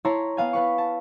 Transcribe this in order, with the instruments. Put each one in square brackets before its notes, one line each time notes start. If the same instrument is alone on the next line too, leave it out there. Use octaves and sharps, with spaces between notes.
[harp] E4 C#5 A5 A#5 C6
B3 F5 G#5
B3 B4 C#6
A5